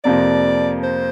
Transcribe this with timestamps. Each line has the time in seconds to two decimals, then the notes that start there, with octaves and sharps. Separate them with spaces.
0.04 F2 C3 F3 A#3 D5
0.84 C5